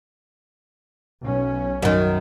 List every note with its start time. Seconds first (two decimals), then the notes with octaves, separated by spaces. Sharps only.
1.24 B1 C#4
1.82 F#2 D#3